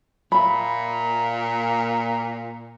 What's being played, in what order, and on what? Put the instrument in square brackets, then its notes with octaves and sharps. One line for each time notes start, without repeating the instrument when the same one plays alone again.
[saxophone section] A#2 [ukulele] E5 B5